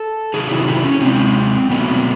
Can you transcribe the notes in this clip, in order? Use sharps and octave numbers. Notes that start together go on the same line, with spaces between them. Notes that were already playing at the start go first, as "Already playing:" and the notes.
Already playing: A4
C3 D#3 F#3 G#4
E4
E4
C#4
C3 F3 G#3 C4
B2 F#3 A3 B3